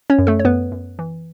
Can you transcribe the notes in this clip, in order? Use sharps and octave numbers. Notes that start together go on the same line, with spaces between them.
C#4 C#5
F#2
A3 A4
C#5
F#2 B3 B4
F#2
E3